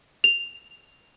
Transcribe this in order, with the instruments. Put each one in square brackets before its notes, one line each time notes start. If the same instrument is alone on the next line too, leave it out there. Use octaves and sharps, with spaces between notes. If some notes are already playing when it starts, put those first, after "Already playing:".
[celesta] F7